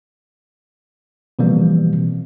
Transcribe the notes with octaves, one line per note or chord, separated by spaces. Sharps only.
B2 E3 F3 G3 A#3 C4